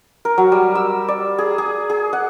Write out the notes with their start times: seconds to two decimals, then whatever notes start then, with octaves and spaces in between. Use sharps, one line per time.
0.25 A#4
0.38 F#3
0.52 G3
0.75 E6
1.08 D5
1.38 G#4
1.58 G#4
1.90 G#4
2.13 F#5